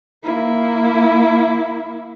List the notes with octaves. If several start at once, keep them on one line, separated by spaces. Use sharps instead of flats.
A#3 E4